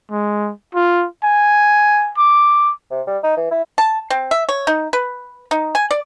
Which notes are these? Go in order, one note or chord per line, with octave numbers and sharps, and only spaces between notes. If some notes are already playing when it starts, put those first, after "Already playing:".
G#3
F4
G#5
D6
C3
G3
D#4
E3
E4
A5
C4
E5
C#5
D#4
B4
D#4
G#5
D5